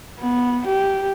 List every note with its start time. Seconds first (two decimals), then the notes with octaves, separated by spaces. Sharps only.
0.20 B3
0.67 G4